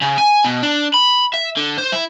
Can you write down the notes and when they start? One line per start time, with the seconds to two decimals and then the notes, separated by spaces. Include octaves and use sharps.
0.02 C#3
0.18 G#5
0.44 B2
0.63 D4
0.94 B5
1.34 E5
1.57 D3
1.78 C5
1.93 E4